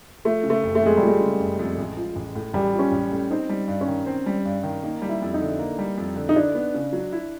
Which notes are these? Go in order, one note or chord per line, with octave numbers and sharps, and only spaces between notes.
F3 A3
C#3
A3
F#1
A3
F2 G#3
F3 G3
G#3
C#3
F#1
F2
A1
F3
A1
A2
A1 G3
F3
C#4
A1
A2
C4 D#4
G3
G2
C#4
D#3
C4
G3
G2
D#3
A#3 D#4
G3
E4
F2
D#4
D3
A#3
G3
F2
D3
D#4
D4 E4
B3
C#3
F#3
E4